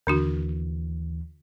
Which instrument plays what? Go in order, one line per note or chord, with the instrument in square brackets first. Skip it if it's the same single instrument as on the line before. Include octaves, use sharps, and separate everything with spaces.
[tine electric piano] D#2 E3 [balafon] D3 D4 F#4